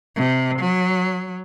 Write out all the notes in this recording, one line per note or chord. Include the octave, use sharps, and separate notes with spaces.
C3
F#3